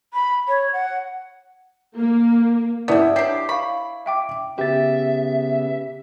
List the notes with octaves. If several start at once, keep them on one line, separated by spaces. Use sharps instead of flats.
B5
C#5
F#5
A#3
G3 B3 E4 D5 A5
D4 G4 C#5 C7
F5 B5 C#6
E5 G5 D6
C#3 B3 G4 E5 A6